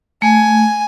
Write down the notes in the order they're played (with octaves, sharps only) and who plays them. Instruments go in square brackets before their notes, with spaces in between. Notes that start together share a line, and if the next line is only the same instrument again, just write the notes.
[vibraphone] A3 [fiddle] G#5